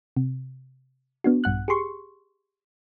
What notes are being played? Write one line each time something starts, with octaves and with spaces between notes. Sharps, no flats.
C3
B3 D4 F#4
A#1 G2 F#5 F#6
G4 G#4 C6 C#6